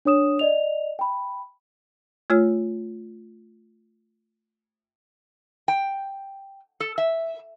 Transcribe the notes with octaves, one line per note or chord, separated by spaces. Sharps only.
D4 C#5 D#6 E7
D5 D#5 F7
G5 B5
A3 F4 C#5 F6
G5
A4
E5